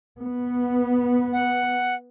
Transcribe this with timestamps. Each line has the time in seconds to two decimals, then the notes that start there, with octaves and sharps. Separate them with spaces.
0.21 B3
1.33 F#5